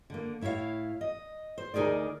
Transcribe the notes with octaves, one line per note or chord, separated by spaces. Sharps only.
D3 A#3
A2 E4 G4 C#5 F5
D#5
C5
D2 D#4 G#4 A#4 D5